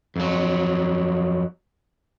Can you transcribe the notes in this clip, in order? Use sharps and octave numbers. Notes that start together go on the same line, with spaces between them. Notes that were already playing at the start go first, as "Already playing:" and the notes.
F2 F#3